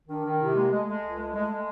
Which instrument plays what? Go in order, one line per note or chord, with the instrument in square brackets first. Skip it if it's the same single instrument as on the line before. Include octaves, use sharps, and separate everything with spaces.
[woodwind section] D#3 [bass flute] D4
[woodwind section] D#3
[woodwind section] C3 [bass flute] E4
[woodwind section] G#3 [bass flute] A#3
[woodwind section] G#3 [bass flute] A3
[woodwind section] G#3 [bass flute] A3
[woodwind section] C#2
G#3
G#3
G#3